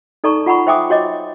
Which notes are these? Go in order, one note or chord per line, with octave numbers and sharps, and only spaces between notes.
D#4 A4 D5 A5 A#5 C#6
F4 F#5 A#5 B5 C#6
C5 E5 G5 G#5 D6 D#6
F#4 C#5 D#5 D6